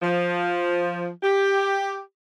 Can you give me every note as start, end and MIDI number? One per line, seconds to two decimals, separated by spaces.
0.02 1.09 53
1.23 1.99 67